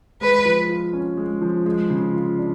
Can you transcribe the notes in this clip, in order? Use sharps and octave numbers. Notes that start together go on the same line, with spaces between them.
G#3 B4
F3
F4
C#4
G#3
F3
G#3
C#3
F4
D4